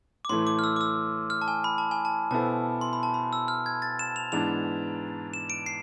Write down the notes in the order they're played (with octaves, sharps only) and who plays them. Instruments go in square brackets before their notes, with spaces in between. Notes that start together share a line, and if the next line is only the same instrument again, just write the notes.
[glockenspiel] D6
[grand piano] A2 E3 A3 [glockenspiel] C6
[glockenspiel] D6
F6
E6
D6
E6
F6
A5
G#5
B5
A5
G#5
A5
[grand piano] B2 B3 E4 A4 C5 [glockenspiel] A5
[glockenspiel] C6
B5
A5
B5
E6
F6
G#6
A6
E7
F7
[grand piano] G#2 E3 B3 D4 [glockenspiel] F7
[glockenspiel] E7
D7
C7